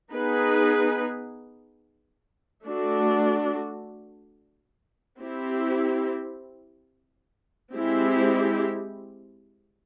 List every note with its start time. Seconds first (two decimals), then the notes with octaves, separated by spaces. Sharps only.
0.11 B3 D#4 G#4 B4
2.65 A3 D4 F#4
5.19 C4 E4 G4
7.73 G#3 C4 E4 G4